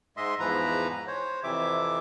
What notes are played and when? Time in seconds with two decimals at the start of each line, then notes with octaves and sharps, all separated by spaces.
0.17 G#2 G#3 D#5 E5 C6
0.40 E2 G#2 E3 F3 B4 A#5
1.07 C5 C#5
1.44 F2 C3 E3 E5 D6